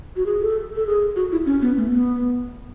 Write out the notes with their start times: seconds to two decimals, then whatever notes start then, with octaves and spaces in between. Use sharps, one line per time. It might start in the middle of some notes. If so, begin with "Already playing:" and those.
0.16 F#4
0.26 G#4
0.41 A4
0.76 A4
0.87 G#4
1.16 F#4
1.32 E4
1.46 C#4
1.62 B3
1.77 A3
1.92 B3